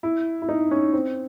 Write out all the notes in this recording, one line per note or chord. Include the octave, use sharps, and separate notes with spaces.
E4
E4
D#4
C#4
C4